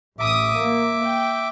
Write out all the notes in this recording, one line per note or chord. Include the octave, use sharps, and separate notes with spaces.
A1 E5 D6 D#6
A#3
G5